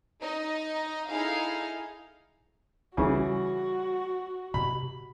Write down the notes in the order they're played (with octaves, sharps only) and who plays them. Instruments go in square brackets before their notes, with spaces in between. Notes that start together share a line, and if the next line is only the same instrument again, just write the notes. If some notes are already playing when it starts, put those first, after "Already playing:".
[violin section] D#4 D#5
D#4 E4 G#4 A4 F5
[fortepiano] C#3 E3 [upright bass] G3 F4 [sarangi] F#4
[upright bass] C3 [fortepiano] B5